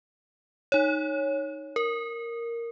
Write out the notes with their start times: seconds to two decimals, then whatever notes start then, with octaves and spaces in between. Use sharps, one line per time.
0.72 D#4 C#5
1.76 A#4